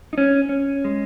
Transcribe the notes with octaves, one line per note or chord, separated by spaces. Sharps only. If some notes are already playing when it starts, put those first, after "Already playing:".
D#4
C#4
C#4
G#3